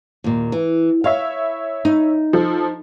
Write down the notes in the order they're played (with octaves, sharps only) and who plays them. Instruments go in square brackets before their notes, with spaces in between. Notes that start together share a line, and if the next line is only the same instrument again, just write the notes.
[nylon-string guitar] D#2 A#2
E3
[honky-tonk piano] E4 C#5 E5 [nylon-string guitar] F5
[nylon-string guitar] D#4
[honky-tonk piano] F3 A4